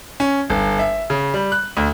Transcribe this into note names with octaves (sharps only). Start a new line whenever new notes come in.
C#4
G1
E5
C#3
G3
F#6
D2